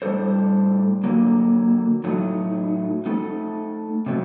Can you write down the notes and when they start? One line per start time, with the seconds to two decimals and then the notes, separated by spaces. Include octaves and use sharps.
0.02 A2 G3 D4 A4 C5
1.04 D3 F#3 A#3
2.04 A2 F#3 A3 D#4
3.06 A3 D#4 A4
4.06 C3 F#3 A3 C4